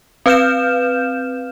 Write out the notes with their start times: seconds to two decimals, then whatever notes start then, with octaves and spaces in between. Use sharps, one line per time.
0.26 C4 B4 F5 F6 G6 E7